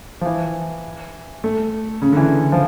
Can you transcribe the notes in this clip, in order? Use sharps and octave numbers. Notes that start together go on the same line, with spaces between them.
F3
E3
A3
C#3
D3
E3
F3